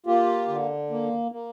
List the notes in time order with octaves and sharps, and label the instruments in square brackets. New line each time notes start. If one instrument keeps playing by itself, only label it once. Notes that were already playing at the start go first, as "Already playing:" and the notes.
[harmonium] A#3 F4 G4
D3
A#3
A#3